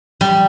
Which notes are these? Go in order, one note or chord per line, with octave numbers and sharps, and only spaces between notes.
G3